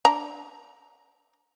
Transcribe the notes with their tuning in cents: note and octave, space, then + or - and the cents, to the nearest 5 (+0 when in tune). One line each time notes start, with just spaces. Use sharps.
D4 +0 A#5 +10